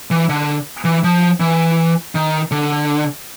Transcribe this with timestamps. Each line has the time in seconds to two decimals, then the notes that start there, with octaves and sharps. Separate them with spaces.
0.11 E3
0.29 D3
0.85 E3
1.04 F3
1.40 E3
2.15 D#3
2.51 D3